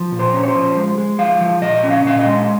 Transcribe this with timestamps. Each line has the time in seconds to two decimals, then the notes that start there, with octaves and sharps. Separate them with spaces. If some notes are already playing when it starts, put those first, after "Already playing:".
Already playing: F3
0.12 A#2
0.19 C5
0.34 C#4
0.43 C#5
0.48 C5
0.55 F3
0.77 G#3
0.98 G#3
1.18 F3 F5
1.41 F3
1.62 A#2 D#5
1.83 C#4
1.91 F5
2.05 A#2 F5
2.19 D#5
2.26 G#3